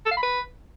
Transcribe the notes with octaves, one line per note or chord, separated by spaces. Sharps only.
A4
F5
B5
B4